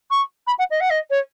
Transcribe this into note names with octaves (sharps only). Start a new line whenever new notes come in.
C#6
B5
F#5
D#5
F#5
D#5
C#5